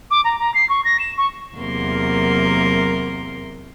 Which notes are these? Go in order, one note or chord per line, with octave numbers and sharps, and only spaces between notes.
D6
A#5
A#5
C7
C#6
A#6
E7
C#6
E2 C3 F#3 A#3 A#4 C6